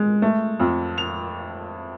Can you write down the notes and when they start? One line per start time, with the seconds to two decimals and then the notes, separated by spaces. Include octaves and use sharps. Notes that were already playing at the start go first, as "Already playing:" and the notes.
Already playing: G#3
0.22 A3
0.60 F2
0.98 F7